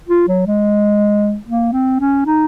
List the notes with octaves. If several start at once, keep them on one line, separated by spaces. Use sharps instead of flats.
F4
F#3
G#3
A#3
C4
C#4
D#4